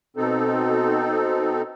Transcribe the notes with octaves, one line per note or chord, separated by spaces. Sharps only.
B2 C4 D#4 A4